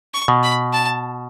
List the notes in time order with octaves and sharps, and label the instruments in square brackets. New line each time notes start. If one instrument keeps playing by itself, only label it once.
[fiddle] C#6
[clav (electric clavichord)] B2
[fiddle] B5
A5